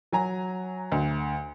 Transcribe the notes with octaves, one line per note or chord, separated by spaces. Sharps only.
F#3 G#5 A#5
D2